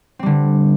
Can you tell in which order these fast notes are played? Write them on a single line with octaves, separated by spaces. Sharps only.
C4 G3 D3